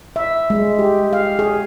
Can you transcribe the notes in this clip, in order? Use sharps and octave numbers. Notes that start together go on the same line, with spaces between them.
E5
G#3
G4
F5
G#4